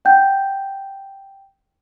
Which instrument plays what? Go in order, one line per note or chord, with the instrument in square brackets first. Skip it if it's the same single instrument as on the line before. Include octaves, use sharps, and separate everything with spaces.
[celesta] F#5 G5 G6